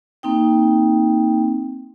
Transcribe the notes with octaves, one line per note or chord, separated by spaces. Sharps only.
A#3 C4 D#4 G5